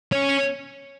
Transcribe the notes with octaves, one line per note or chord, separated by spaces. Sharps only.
C#4